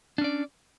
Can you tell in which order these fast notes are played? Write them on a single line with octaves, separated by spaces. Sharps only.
D4 C#4 D5